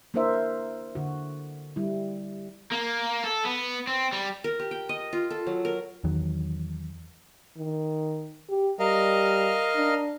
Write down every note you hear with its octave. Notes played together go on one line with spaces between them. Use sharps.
A#3 D4 E4 A#4 C5 E5
D3 F#4
G3 E4
A#3
A4
B3
C4
G3
A#4
G4
G5
D#5
F4
A4
F#3
A#4
E2 D#3 F#3
D#3
G4
G3 A#4 D#5 F5
D4